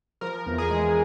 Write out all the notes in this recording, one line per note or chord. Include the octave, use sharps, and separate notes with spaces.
F3 A#4
E2
G#4
G#3